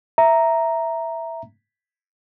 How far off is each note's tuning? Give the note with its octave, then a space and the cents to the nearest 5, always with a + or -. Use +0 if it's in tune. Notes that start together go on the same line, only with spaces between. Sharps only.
E5 +0 A#5 +0